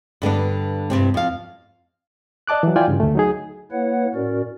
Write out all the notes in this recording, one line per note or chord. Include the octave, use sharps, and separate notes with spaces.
G2 D3 B3 D4
G2 C3 C4
F2 F5
D5 D#5 A5 D6 F#6
E3 F#3
E4 F4 D5 G5 G#5
G2 C#3
D2 A3
F#3 D#4 G#4
A#3 E4 B4 C#5 F#5
A2 C#4 F#4 A#4 D5